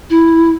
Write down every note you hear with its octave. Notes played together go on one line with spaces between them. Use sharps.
E4